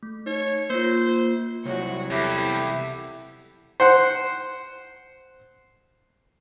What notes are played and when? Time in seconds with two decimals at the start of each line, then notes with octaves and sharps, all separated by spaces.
0.03 A3
0.26 D#4 C#5
0.70 A#3 F4 C5
1.65 C2 F#3 F#4 C#5
2.11 E2 E4 G4 A4
3.80 C5 F#5